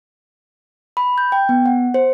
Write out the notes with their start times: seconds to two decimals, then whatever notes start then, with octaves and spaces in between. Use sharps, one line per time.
0.97 B5
1.18 G6
1.32 G5
1.49 B3
1.66 F#5
1.94 C5